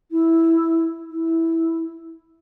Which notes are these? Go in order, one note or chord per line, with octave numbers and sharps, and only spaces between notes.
E4
E4